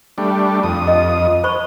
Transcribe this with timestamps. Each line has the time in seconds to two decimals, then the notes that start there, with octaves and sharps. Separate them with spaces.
0.18 G3 A3 D4
0.63 F2 D#6
0.87 D#5
1.44 C5 B5 C#6